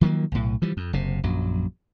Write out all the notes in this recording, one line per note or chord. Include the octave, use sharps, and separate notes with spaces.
D#3 F3 F#3 A#3
B1 A2
E3 F3 G3
F2
F#1 C3
A#1 F#2 F#3